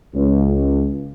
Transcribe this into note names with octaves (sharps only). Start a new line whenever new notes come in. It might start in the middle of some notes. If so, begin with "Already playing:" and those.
C#2